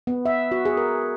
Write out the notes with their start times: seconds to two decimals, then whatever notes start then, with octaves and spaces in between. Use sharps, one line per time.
0.07 B3
0.26 E5
0.52 F#4
0.65 G#4
0.77 A#4